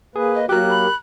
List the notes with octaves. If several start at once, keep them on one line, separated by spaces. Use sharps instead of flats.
A#3 G#4 B4
D#5
F#3 A#3 F#4 G4 A#4 F#6
B5